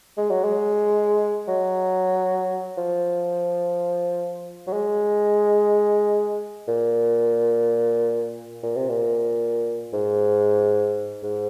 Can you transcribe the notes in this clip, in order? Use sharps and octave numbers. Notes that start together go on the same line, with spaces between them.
G#3
F#3
G#3
F#3
F3
F#3
G#3
A#2
A#2
C3
A#2
G#2
G#2